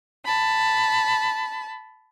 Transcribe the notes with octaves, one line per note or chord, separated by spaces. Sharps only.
A5 B5